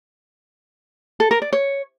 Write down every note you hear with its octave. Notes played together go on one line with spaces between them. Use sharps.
A4
A#4
D5
C#5